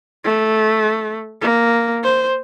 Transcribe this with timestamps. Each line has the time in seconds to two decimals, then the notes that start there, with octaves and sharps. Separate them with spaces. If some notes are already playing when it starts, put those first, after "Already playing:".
0.24 A3
1.41 A#3
2.03 C5